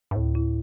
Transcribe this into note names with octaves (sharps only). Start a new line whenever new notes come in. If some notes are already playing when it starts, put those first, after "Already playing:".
G2
D2 A2
E4